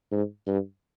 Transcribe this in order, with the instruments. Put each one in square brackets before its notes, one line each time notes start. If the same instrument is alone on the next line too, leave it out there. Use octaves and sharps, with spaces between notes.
[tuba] G#2
G2